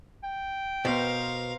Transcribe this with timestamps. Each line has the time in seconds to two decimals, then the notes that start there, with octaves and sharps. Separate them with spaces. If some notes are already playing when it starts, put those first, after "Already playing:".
0.24 G5
0.85 B2 B3 A#4 C5 F5